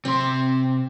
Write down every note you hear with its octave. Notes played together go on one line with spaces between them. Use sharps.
C3 C4 C6